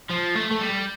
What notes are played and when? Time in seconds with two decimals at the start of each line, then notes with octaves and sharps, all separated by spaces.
0.11 F3
0.36 A3
0.51 A3
0.61 G3